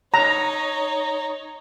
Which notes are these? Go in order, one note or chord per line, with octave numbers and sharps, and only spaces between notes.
D#4 C#5 A#5